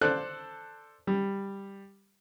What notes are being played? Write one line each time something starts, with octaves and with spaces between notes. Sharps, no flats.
A4 C5 D5 F#6
G3